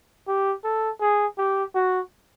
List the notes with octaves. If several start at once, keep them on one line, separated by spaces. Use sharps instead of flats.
G4
A4
G#4
G4
F#4